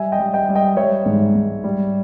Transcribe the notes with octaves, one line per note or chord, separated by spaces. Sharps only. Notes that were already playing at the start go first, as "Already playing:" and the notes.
Already playing: G3 E5 G#5
D#5 G5
G3
D#5 G5
G3
D#5 G5
G3 C#5 E5
G#2
G#2
G3